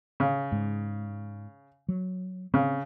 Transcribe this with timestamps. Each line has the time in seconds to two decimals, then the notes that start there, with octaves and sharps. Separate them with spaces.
0.20 C#3
0.52 G#2
1.89 F#3
2.54 C#3 C4